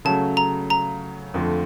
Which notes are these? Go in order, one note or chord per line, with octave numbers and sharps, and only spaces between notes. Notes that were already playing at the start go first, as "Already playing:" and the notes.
C#3 F#3 A3 A5
A#5
A#5
F2 D3 F3 A3